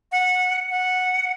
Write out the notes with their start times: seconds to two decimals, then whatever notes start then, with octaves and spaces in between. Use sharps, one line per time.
0.12 F#5
0.71 F#5